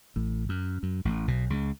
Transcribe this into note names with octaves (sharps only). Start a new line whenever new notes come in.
A1 A2
F#2
F#2
A1 A2
B1 B2
C#2 C#3